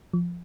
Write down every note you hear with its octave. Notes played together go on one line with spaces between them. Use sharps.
F3